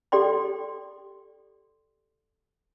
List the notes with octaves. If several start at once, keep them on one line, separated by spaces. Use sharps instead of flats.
G4 A4 D5 G5 C6